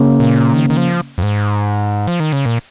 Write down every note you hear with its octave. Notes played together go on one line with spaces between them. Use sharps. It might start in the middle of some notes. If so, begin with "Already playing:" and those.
Already playing: C#3 A#3 C#4
A#2
D#3
D#3
F3
F2
G#2
F3
D#3
C#3
A#2